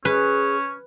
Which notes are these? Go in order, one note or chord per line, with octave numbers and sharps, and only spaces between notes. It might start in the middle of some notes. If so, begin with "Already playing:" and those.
C#4 G#4 B4